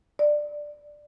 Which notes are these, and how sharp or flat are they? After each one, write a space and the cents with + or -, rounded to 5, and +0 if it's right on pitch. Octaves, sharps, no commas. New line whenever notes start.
D5 +10